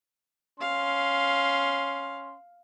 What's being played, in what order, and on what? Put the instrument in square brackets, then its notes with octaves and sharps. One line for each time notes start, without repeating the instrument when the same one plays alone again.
[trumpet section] C#4 C6 [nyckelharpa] F5